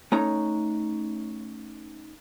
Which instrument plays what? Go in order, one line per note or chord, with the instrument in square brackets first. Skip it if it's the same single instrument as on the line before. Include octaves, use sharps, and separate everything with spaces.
[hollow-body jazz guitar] A3 C#4 D#4 C#5 A#5